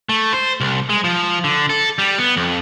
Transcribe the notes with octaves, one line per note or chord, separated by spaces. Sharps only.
A3
C5
C2
G#3
F3
D3
A4
G3
B3
F2